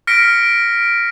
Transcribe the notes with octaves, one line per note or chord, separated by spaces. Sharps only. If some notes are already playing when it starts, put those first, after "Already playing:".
F6 A#6 B6 C#7 D7